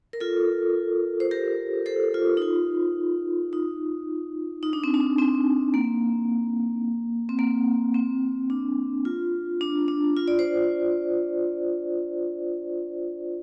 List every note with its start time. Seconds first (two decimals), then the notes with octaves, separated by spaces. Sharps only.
0.13 A#4
0.20 F4 A4
1.20 C5
1.31 G4 A#4
1.86 A4 C5
2.14 F4
2.37 D#4
2.42 F4
3.53 D#4
4.63 D#4
4.73 D4
4.84 C4
4.94 D4
5.18 C4
5.74 A#3
7.29 C4
7.39 A#3
7.94 C4
8.50 D4
9.05 F4
9.61 D4
9.88 D4
10.17 F4
10.28 D5
10.39 C5